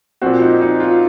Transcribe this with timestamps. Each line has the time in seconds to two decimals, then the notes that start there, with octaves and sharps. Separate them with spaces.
0.22 A#2 F3 C4 F#4
0.42 D#4
0.61 D#4
0.80 F4